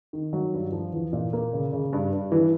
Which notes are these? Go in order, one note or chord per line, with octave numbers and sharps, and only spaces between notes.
D#3
F#3
G2
F3
E2
A#2
A#3
C#3
C#3
G2
G2
E3